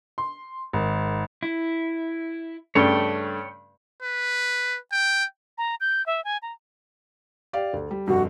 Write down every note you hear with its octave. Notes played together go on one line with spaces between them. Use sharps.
C6
G#1
E4
G2 C#3 A3 C#5 G5
B4
G5
A#5
G6
E5
G#5
A#5
G4 D5 F5
D2
G3
F1 G2 F#4